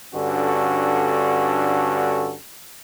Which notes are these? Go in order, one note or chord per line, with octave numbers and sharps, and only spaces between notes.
G2 D3 C#4 F#4 A4